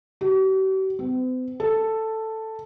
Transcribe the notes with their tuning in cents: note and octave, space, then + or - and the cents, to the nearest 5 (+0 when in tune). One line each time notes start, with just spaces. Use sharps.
G4 -45
C4 -45
A4 +5